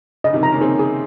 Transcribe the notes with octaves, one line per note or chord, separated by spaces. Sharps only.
C#3 D#5
C3 D#3
C#3 F3 A#5
A#3 C#4
C4 D#4 G#4
G#4